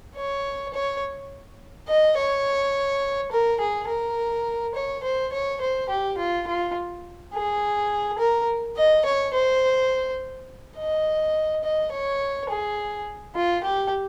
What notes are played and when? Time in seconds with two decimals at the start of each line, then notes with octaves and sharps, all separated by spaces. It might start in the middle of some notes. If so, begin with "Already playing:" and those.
0.16 C#5
0.73 C#5
1.88 D#5
2.17 C#5
3.32 A#4
3.60 G#4
3.88 A#4
4.75 C#5
5.04 C5
5.33 C#5
5.62 C5
5.89 G4
6.18 F4
6.47 F4
7.33 G#4
8.19 A#4
8.77 D#5
9.05 C#5
9.34 C5
10.77 D#5
11.64 D#5
11.92 C#5
12.50 G#4
13.35 F4
13.64 G4